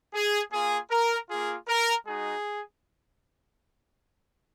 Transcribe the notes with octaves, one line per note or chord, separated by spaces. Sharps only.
G#4
A#3 F4 G#4
A#4
A#3 F4 G#4
A#4
G#3 D#4 F#4 G#4